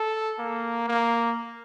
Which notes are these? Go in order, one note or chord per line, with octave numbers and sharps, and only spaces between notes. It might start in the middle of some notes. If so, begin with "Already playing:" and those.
Already playing: A4
A#3
A#3